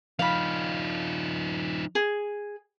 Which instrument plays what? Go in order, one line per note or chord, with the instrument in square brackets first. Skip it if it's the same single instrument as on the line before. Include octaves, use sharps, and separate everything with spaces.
[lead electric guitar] F3 D#4 [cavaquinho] F5 B5
[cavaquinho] G#4